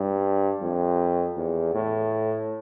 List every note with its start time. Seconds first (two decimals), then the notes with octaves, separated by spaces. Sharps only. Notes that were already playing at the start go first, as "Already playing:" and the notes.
Already playing: G2
0.62 F2
1.37 E2
1.74 A2